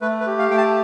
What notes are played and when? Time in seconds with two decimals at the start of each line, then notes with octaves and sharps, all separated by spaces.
0.01 A3 B4
0.20 B4
0.26 G4
0.39 F5
0.51 A3 G5
0.57 A5